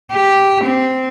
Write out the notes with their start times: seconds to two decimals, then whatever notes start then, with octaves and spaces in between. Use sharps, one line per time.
0.12 G4
0.64 C4